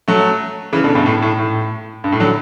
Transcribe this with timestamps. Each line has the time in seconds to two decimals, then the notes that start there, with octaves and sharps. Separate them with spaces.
0.08 F#3 A3
0.73 C#3 E3
0.84 B2 D3
0.95 G2 B2
1.06 A2
1.22 A2
1.39 A2
2.04 G2
2.12 A2
2.20 D3 F#3